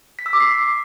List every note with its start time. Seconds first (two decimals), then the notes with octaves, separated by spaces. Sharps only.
0.19 B6
0.26 E6
0.33 D6
0.40 C7